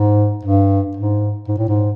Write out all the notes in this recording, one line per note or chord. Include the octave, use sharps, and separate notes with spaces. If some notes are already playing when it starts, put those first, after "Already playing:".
Already playing: G#2
G2
G#2
G#2
A2
G#2